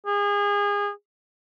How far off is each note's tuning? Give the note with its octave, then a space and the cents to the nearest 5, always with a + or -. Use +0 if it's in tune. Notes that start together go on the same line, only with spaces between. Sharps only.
G#4 -30